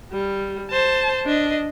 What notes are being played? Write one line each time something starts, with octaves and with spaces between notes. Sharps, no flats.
G3
C5 A5
D4 D#5